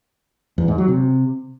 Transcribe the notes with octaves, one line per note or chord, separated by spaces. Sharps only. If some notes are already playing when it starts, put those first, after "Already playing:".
E2
G#2
F#3
C3